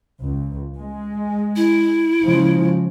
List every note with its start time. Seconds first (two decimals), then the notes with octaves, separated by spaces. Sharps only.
0.21 C#2
0.76 G#3
1.56 E4
2.21 C#3 F3 G#3